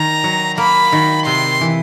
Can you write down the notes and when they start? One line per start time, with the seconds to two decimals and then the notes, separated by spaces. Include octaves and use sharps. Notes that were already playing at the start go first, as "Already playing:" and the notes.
Already playing: D#3 A#5
0.24 F#3
0.58 A#3 B5
0.92 D#3
1.26 C3 C6
1.61 E3